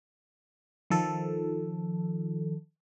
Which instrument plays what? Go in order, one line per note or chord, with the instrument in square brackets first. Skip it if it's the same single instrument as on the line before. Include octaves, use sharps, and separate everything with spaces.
[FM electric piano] D#3 F3 A4